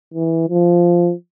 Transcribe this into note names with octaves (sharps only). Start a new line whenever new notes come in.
E3
F3